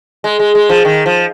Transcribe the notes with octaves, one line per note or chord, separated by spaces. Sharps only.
G#3
G#3
G#3
F3
D#3
F3